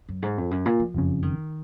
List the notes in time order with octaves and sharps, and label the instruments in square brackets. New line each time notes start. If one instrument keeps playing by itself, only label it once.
[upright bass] F#2
G#2
F2
F#2
A#2
F3
[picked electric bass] F#1 F2 C#3
[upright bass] D#3